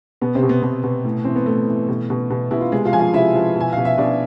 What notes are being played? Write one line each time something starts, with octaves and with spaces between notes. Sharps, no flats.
B2 B3
C3 C4
B2
B3
B2 B3
B2
A2
E3 C4
B3
A2 A3
E3
B2
B2
B2
B2 E4
F4
C3 G#3 G#4
F4 F5
F3 G#5
F4 F5
C3 E4 E5
F3
B2 G#5
B2 F5
E5
B2 D4 D5